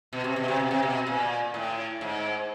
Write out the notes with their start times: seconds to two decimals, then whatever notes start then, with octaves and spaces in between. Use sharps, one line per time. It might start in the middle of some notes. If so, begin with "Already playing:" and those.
0.13 B2
0.24 C3
0.36 B2
0.48 C3
0.59 B2
0.71 C3
0.83 B2
1.07 A#2
1.54 A2
2.01 G#2